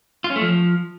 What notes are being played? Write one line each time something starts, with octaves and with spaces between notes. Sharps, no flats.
F4
C#4
A3
F3